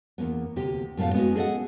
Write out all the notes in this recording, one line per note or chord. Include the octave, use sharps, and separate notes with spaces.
E2 G#2 A#3 B3
D2 C3 G4
F#2 A2 A3 B3 F5
G#3 B3 C#4 D#4 E4 F#4
G#4 A4 D#5 E5 F#5